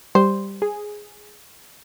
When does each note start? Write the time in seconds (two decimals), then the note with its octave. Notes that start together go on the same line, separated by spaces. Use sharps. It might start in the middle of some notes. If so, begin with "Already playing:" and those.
0.15 G3 C5
0.62 G#4